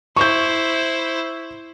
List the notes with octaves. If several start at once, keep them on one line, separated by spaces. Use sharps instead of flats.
E4 C5 C#6 G6